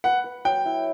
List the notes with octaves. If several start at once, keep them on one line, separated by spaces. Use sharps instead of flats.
B4 F#5
B4
F#3 G5
E4